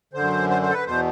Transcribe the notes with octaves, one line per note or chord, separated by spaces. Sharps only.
F#2 D3 C5
C5
C5
A4
B4
E2 B2 C5